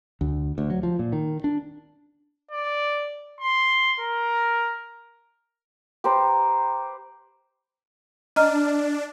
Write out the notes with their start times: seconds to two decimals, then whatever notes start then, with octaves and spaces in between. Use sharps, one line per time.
0.21 D2
0.58 D2
0.70 F#3
0.83 F3
0.99 A#2
1.13 D#3
1.44 D4
2.51 D5
3.41 C6
4.00 A#4
6.04 G4 B4 C5 A#5
8.36 D4 D#5 A#5 F6